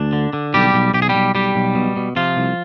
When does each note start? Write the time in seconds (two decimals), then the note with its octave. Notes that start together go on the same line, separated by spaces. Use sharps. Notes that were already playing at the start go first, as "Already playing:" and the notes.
Already playing: D2 D4
0.13 D3
0.33 D3
0.54 B1 G3 G4
0.74 B1
0.94 B1 G4
1.02 G#4
1.09 G3 G4
1.15 B1
1.34 B1 G3 G4
1.55 B1
1.75 B2
1.97 B2
2.16 C3 F3 F4
2.37 C2